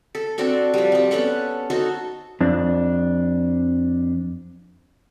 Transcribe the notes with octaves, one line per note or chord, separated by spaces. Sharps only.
A4
C4 D4 F#4 A4
F3 G3
G3 C4
B3 C#4 A4 F#5
D#4 F#4 A4 C5
F2 D4